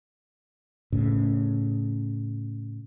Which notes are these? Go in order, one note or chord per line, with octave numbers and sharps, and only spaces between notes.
A2 C#3